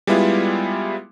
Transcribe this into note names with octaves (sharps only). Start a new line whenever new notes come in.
G3 G#3 B3 E4 F4